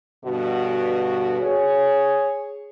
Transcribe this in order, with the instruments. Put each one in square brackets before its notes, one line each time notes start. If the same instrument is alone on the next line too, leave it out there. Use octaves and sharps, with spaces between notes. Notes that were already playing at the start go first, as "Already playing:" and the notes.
[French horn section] G2 B2 D3 F#4
G#4 C#5